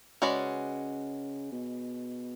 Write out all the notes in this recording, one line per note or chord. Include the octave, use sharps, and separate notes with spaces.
C#3 G#3 C#4 F#4 B4 D5
B2